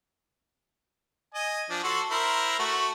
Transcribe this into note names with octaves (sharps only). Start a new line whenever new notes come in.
D#5 G#5
F3 D4
F#4 A4 C6
E4 A#4 C5
A3 F#4